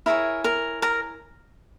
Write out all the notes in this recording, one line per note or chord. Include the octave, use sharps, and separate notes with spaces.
E4 G#4 A#4 C#5 A#5
A#4 A#5
A#4 A#5